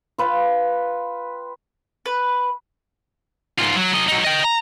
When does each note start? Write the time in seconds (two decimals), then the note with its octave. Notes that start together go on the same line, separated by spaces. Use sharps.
0.18 F4 B4 G5
2.06 B4
3.59 G#2 F4
3.76 F#3
3.93 F#3 D#5
4.08 F#3 D#4
4.24 D#5 G5
4.44 A#5